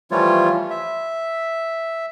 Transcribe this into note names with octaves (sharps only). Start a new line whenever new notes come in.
E3 F3 G3 A3 F4 C#5
E5